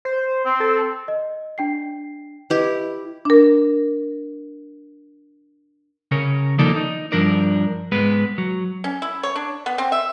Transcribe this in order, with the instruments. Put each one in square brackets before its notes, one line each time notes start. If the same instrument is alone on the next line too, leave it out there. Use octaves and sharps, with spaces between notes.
[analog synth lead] C5
[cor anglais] C4
[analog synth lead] A4
[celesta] D#5
D4 G5 C7
[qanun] E4 G4 [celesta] B4 D#5
[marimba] D4 A#4
[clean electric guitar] C#3 C#4 A#4 C#5
D#3 F3 A#3 D#4 A4 D5
D#4
G2 F3 D4 A#4 D5
G#2 G#3 B3 B4
F#3
[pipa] C#4
E4
C#5
D4
B3
C4
E5